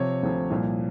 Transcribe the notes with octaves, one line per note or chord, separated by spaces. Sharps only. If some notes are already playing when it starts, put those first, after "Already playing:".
Already playing: C3 F3 C#5
D2 C3 F3
C2 A#2 F3